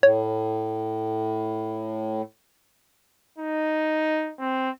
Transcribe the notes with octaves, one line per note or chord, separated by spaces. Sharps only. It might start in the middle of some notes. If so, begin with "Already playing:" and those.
A2 C#5
D#4
C4